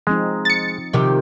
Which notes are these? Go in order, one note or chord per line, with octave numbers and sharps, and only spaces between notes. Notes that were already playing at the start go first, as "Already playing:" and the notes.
F3 G#3 C4 D#4
A6 C#7
C3 D#3 F3 G4